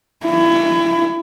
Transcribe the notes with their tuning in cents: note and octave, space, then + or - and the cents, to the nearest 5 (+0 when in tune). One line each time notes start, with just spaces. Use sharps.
E4 +30